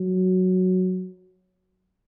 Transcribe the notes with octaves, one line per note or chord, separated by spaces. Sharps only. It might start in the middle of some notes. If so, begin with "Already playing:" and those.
Already playing: F#3